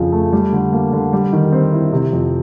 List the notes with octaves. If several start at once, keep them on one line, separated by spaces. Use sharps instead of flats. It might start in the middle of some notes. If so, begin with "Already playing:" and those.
Already playing: F2 C#3 F3
A3
G3
D3
A#3
D3
G3
D#3
C4
E4
C3
F2